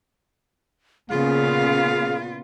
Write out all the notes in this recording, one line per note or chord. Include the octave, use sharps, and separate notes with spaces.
A#2 C#3 B3 F4 G#4 F5